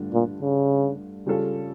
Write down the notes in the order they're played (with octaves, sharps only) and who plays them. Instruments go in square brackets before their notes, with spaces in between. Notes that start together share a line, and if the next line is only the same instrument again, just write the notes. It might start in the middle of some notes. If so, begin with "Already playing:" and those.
Already playing: [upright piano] G2 D3 A3 D4 F4
[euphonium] A#2
C#3
[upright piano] C#3 G3 C#4 F4 A4